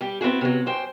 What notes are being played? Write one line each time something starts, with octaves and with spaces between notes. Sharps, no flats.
G3 G4
B3 C4 E4 F#4 G#4
C3 F#3
F#2 C5 G5